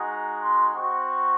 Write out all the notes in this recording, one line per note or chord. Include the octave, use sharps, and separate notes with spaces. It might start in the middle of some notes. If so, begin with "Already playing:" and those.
Already playing: G#3 D#4 F#4
A#5
C6
C4 F#4 C#6